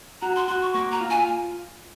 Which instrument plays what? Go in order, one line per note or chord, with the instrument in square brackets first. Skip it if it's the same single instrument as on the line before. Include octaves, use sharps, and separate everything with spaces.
[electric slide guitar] F#4 [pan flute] A#5
[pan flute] C6
[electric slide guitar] F#4 [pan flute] C6
[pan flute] C#6
[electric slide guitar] A#3 [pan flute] C#6
[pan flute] A#5
[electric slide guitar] F4
[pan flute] G#5